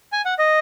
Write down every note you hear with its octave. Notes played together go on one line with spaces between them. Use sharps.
G#5
F#5
D#5